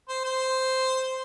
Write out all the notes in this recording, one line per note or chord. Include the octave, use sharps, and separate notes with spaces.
C5
C5